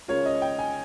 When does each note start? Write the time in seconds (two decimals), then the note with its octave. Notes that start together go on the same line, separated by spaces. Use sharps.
0.08 C#3 G#3 C#4 F4 A#4 C#5
0.26 D#5
0.42 G5
0.59 G#5